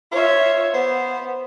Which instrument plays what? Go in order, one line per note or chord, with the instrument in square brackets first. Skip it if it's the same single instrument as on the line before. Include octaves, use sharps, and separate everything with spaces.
[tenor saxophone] F4 [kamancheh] C#5 E5
[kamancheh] B3 [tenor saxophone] C5